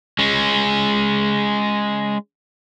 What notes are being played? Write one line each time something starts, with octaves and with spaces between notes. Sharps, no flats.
G#3 C#4